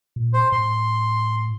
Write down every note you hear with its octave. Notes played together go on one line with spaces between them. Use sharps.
A#2
C5
A2 C6